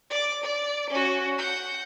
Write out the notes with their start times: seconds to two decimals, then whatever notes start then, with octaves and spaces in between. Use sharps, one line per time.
0.10 D5 D6
0.43 D5
0.90 C#4 F#4
1.38 F#5 G6